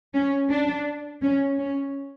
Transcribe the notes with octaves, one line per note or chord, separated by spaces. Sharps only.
C#4
D4
C#4
C#4